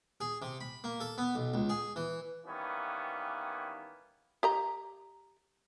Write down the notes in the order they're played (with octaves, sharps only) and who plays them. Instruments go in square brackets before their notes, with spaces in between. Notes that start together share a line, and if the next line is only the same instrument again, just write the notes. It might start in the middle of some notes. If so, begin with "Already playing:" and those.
[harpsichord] G#4
C3
B5
A#3
A4
B3
B1
C#2
G#4
E3
[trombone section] D#3 E3 G3 A#3 B3 C#4
[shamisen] G4 D#5 A#5